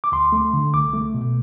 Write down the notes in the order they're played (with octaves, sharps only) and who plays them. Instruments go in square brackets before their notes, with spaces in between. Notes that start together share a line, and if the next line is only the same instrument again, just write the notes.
[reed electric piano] D6
D2 C6
A3
D3
C2 D6
A3
B2